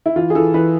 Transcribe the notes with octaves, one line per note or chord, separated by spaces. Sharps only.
E4
E3 F4
G#4
E3 A4
E3 B4